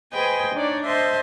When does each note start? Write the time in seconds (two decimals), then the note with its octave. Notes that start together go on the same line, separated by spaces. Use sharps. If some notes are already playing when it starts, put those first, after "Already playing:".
0.13 G#4 B4 C5 D#5 G5 G#5
0.54 D4 D#4 C#5 D5
0.86 C5 D#5 E5 A5 C6